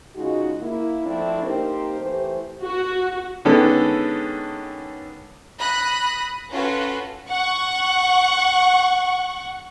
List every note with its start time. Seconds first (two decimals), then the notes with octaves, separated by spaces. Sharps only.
0.16 C#3 G#3 D#4 F4 F#4
0.61 A#3 E4
1.06 F3 A3 C4 D4 E4
1.44 A#3 C4 D#4 G4 A#4 C5
2.00 E3 A3 G4 C5
2.64 F#4
3.45 D3 D#3 G#3 B3 C#4 A4
5.58 B5 D#6 F#6 A#6
6.50 C#4 F4 F#4 A4 B4
7.30 F#5 C#6